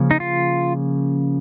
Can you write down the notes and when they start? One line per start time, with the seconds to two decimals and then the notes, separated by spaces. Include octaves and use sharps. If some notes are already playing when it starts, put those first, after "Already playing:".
Already playing: C#3 F3 A#3 C#4
0.11 D#4
0.20 F4